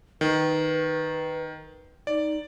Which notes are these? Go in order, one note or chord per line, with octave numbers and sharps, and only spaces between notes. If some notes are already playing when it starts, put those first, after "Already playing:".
D#3 B4
D#4 D5